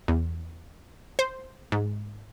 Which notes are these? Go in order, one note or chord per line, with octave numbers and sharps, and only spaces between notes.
E2
C5
G#2